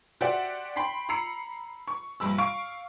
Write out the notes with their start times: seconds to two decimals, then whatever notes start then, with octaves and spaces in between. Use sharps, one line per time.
0.21 F#4 G4 C5 D5 E5 F#5
0.76 G5 B5 C6 B6 C7
1.09 A#5 B5 E6 C7 C#7
1.88 C#6
2.20 A#1 G2 B5 E6
2.38 F5 C#6 D7